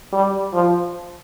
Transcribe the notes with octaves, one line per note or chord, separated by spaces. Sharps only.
G3
F3